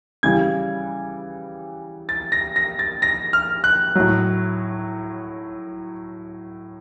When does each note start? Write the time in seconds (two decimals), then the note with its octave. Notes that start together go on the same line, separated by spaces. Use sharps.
0.23 C#3 E3 G3 G#6
2.09 A6
2.32 A#6
2.56 A#6
2.79 A6
3.02 A#6
3.33 F6
3.64 F#6
3.95 A2 F#3